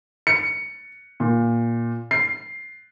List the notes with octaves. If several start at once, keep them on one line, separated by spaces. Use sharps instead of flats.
C#7
A#2
C7